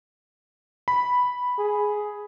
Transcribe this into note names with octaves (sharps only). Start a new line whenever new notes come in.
B5
G#4